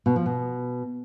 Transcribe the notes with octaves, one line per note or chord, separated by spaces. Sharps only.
B2
F3
B2